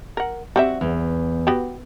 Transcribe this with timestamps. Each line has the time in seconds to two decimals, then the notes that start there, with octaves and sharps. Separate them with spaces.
0.17 A#4 F#5
0.56 G3 C4 F#4 E5
0.81 E2
1.47 B3 F#4 G4